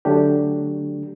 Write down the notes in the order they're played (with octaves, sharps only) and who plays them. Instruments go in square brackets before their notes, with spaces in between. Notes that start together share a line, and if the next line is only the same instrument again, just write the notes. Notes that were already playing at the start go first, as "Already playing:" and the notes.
[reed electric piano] D3 F#3 A3 D4 G4